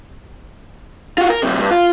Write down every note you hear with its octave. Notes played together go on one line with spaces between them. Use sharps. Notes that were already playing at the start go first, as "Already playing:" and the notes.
F4 F#4
A#4
F#2 C3
G2
F4